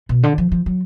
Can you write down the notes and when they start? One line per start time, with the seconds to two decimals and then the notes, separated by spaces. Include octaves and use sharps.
0.09 B2
0.23 D3
0.38 F3
0.52 F3
0.66 F#3